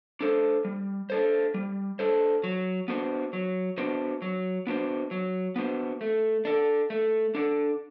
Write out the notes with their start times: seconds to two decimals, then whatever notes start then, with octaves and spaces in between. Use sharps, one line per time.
0.21 D4 A4 C5
0.65 G3
1.10 D4 A4 C5
1.54 G3
1.99 D4 A4 C5
2.44 F#3
2.88 B3 D4 F#4 C5
3.33 F#3
3.78 B3 D4 F#4 C5
4.22 F#3
4.67 B3 D4 F#4 C5
5.11 F#3
5.56 B3 D4 F#4 C5
6.01 A3
6.45 D4 A4 D5
6.90 A3
7.35 D4 A4 D5